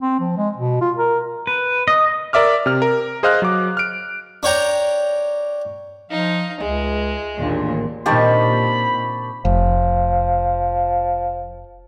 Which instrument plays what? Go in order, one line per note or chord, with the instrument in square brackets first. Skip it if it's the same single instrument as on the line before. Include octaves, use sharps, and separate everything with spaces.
[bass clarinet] C4
F3
G#3
B2
F4
A#4
[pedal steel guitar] B4
D#5
[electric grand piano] A#4 D5 E5 D6 F6
C3 F6
A#4
G#4 C5 D#5 F5 F6 F#6
F#3 D6
F6 D7
[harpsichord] D4 C#5 G5 A#5
[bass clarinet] F3 [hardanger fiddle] D#4 F5
[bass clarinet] C#2 [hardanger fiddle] G#3 [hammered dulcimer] G#4 E5
[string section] A1 D#2 A#2 [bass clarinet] D4
[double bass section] A#2 [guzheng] D#3 C4 D4 [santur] G4 A5 C#6 [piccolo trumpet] B5
[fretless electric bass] F1 [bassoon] F3